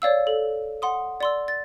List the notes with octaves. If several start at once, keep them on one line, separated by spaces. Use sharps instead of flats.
C#5 D5 F5 E6
A4
F#5 C6 D#6
D5 C6 E6
A6